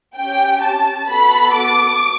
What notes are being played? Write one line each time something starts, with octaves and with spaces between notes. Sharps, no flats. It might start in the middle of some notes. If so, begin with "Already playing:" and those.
C#4 G4 G5
A5
B3 F#4 A4 B5
D6